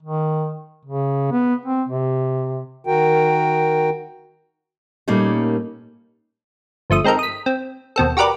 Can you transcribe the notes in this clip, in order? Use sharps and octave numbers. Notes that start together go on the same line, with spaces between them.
D#3
C#3
B3
C4
C3
D#3 F#4 A#4 G5
A#2 G3 A3 A#3 C#4 D#4
G1 F3 A3 D#6
G#3 C4 D#4 A4 A#4
D#6 B6
C4
D#2 B2 C4 A4
F#4 G4 A#4 B4 D5